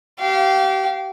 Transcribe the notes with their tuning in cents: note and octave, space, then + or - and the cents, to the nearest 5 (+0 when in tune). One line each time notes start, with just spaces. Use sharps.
G4 -30 F5 -15